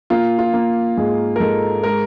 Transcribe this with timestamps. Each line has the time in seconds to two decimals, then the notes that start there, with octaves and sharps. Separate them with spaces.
0.10 A#3 F4
0.39 F4
0.54 A#3
0.97 G#2 G#4
1.36 A#4
1.40 G#2 A4
1.83 G#3 A#4